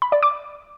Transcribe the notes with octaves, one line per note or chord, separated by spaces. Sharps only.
B5
D5
D6